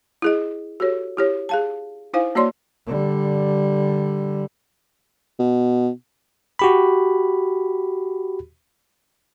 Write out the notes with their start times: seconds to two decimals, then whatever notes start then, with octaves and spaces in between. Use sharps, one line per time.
0.22 E4 G#4 D#5
0.80 F#4 G4 A4 C#5
1.17 E4 G4 C#5
1.49 G#4 F5 A5
2.13 D#4 E4 C5 F5 G#5
2.35 A#3 F#4 C#5 D5 C6
2.86 D3 G3
5.39 B2
6.59 F#4 G4 B5